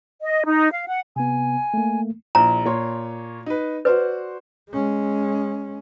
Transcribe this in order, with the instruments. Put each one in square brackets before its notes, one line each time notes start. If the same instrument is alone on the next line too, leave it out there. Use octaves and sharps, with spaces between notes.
[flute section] D#5
D#4
F5
F#5
[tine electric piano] C3 B3 [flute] G#5
[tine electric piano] A3 A#3
[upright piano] A#1 E4 [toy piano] A#5
[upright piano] A#2 C#5 C6
D#4 B4
[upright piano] F#4 C5 D5 [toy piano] B4
[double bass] G#3 C#4